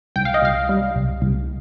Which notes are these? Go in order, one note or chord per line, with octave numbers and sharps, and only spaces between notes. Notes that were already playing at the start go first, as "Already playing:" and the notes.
C2 G5
F5
D#5
C2 F5
G3
C2
C2